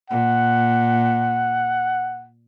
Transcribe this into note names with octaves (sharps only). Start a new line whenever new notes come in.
A#2 F#5